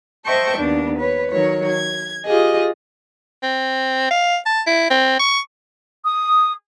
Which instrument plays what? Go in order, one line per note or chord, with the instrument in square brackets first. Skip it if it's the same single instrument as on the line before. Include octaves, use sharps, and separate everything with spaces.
[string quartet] C5 D#5 E5 G5 A5 C#6
D#2 B3 D4
B4 C#5
D#3 F#3 C#5
G#6
F4 G4 G#4 D#5
[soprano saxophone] C4
F5
A5
E4
C4
C#6
[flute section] D#6